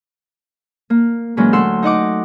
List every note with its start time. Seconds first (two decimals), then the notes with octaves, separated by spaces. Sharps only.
0.90 A#3
1.37 A#2 E3 F#3 G#3 A#3 C#4
1.53 D2 A3 F#5 C6 E6
1.83 D#4 D#5 F#5 D6